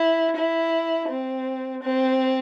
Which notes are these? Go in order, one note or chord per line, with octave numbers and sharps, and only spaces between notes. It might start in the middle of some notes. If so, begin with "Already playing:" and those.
Already playing: E4
E4
C4
C4